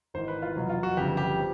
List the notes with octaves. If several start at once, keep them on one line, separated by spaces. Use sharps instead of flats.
G#1 G#2 E3 C5
B4
F4
F1 E2 B2 F#3
F4
F#4
G1 F2 C#3 G4
G4
F3